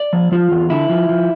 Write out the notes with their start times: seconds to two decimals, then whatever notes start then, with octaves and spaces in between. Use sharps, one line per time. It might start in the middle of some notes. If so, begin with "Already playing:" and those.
Already playing: D5
0.13 F3
0.32 F3 F4
0.51 E2
0.70 D3 E4
0.89 F3
1.09 F3